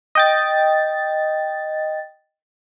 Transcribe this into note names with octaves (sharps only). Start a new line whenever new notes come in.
D#5 G5 A6